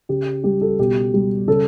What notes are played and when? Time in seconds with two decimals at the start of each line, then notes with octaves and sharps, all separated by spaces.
0.09 C#3 G4
0.44 G3 G4
0.61 A4
0.79 B2 G4
1.14 G3
1.48 C#3 A4